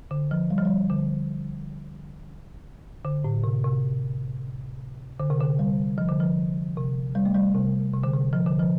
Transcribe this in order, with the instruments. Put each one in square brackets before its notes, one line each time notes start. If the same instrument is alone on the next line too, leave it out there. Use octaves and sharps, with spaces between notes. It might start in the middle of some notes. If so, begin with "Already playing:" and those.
[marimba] D3
F3
G3
F3
G3
D3
D3
A2
C3
C3
D3
C3
D3
G3
F3
D3
F3
C3
G3
A3
G3
C3
C3
D3
C3
F3
D3
F3